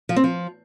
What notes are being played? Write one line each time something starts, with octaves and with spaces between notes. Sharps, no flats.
F3
C4
F3